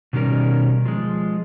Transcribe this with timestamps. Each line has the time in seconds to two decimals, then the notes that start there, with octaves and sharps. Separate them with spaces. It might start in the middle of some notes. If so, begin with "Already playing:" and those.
0.13 B2 D#3 G3 C#4 A#4
0.85 F3 G#3